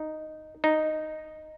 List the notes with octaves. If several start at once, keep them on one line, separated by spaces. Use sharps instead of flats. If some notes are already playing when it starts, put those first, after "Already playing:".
Already playing: D#4
D#4